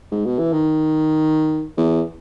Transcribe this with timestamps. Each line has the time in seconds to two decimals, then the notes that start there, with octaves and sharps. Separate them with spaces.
0.12 G#2
0.26 B2
0.39 E3
0.53 D#3
1.77 E2